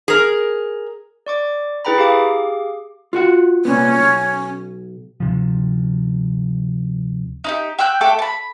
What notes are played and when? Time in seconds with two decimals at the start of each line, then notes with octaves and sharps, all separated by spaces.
0.08 G#4 A#4
1.26 D5 C#6 D6
1.85 E4 G#4 B4 G5 A#5 B5
1.98 G4 G#4 F5 D6
3.13 F4 F#4 F#5
3.65 C2 A#2 B3 C#4
4.00 B1
5.20 D2 C3 F3
7.44 D#4 E4 G4
7.79 G5 E6 F#6 G6
8.01 A3 A4 G5 D6
8.19 A5 B5